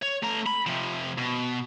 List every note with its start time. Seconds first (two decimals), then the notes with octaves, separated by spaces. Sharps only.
0.02 C#5
0.23 A3 A#5
0.46 B5
0.67 C3 F3
1.18 B2